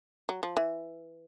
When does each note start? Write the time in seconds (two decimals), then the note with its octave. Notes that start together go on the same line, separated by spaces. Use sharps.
0.29 F#3
0.43 F3
0.57 E3